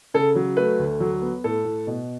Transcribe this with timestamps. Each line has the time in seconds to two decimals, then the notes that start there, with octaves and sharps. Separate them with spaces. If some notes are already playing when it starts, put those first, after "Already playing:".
0.14 C#3 A4
0.35 F#3
0.57 A3 B4
0.79 D2
1.00 F#3
1.22 B3
1.44 A2 A4
1.65 A2
1.87 B2